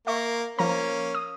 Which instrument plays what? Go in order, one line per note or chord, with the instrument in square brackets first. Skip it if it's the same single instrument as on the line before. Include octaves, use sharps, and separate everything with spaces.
[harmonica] A#3 [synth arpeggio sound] E5 C#6
[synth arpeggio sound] F3 A#5 [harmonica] A#3 C#4
[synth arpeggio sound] D#6